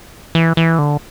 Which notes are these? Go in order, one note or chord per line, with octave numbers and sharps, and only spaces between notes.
E3
E3
D3